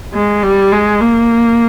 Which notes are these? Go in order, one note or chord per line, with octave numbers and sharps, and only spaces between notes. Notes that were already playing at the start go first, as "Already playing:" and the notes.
G#3
G3
G#3
A#3